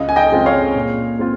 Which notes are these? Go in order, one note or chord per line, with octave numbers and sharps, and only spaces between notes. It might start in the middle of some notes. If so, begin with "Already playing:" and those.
Already playing: C#2 D#5
G#5
D#5 G5
C#3 G#3 C4 F4
C#5 F5
A#2
G#3 C4 F4